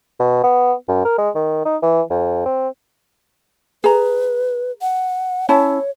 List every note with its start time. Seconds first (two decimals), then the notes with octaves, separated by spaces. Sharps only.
0.20 B2
0.44 B3
0.88 F#2
1.05 A#4
1.18 G#3
1.35 D#3
1.65 D#4
1.82 E3
2.10 F2
2.46 C4
3.84 G#4 B4 A#5
4.81 F#5
5.49 C#4 E4 C#5 A5